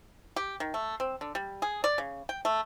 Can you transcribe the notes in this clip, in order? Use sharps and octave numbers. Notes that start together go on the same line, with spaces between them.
G4
D#3
A3
C4
D3
G3
G#4
D5
C#3
G5
A3